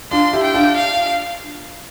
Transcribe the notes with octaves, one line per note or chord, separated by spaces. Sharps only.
D4 F4 C6
E4 G4
G5
D4 F4
F5